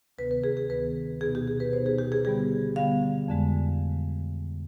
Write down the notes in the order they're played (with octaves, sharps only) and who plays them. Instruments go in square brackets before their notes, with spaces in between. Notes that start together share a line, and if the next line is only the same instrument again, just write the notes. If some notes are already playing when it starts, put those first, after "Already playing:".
[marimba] D2 C3 D#3 B3 B4
B4
G#4
G#4
D2 C3 D#3 B3 B4
B2 B3 D#4 G#4
G4
G#4
B4
B2 B3 D#4 C5
G#4
G4
G#4
D3 G3 B3 G#4
D3 G3 B3 F5
F2 D3 G#3